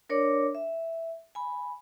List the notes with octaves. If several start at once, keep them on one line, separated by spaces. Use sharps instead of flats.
D4 A#4 C#5 D5 D6
E5
G#5 B5